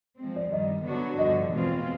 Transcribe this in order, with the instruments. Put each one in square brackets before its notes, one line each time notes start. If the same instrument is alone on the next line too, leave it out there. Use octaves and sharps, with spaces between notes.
[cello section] F3 G#3 C4
[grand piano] D5
[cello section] G2 D#3 G3 [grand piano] D#5
[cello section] D3 F#3 B3 D4 F#4
[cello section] G2 D3 F3 [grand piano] D#5
[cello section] E2 B2 G#3 C4 F4